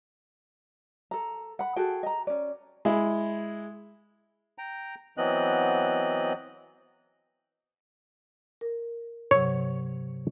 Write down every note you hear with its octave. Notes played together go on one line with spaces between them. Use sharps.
A4 A#5
F#5 B5
F#4 G#4 A4 G5
D#5 A#5
C#4 D5
G#3 E4
G5 A#5
E3 F#3 B3 C4 D#5 F#6
A#4
G2 C3 F#3 C#5